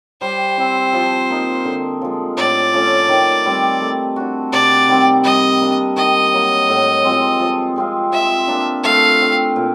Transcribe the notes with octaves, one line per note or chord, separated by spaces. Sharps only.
G3 C5
C4 E4
F3
A#3 D#4
D3
F3 G#3
A2 D5
F3 A3 C#4
D#3
G3 C4
A3
D4 F#4
C3 D5
D#3 G3 C4
G3 D#5
A#3 D4
D#3 D#5
F#3 A#3
A2
F3 G#3 C4
F3
G#3 C4 F4
F3 E5
A#3 D4
A3 F5
C4 E4
A#2